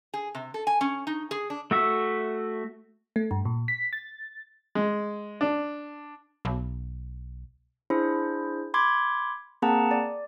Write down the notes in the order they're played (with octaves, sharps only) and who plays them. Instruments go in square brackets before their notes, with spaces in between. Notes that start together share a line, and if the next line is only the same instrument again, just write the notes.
[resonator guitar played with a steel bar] G#4
C3
A4
G#5
C#4
D#4
G#4
D4
[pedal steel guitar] A3 F#4 E5
[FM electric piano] A3
G2
A#2
B6
A6
[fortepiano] G#3
D4
[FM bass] B1
[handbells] D4 E4 G#4 C5
B5 C6 D6 G#6
A#3 C4 G#4 F#5 A5 A#5
D5